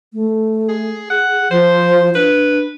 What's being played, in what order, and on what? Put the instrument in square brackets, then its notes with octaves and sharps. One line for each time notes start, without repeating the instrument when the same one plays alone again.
[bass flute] A3
[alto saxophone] G#4
[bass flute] G#4 [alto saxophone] F#5
[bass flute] F3 [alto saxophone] C5
[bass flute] D4 [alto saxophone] B4